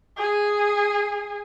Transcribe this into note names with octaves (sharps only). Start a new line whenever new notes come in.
G#4